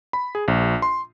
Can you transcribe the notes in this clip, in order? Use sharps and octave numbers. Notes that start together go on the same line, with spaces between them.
B5
G#4
A#1
C6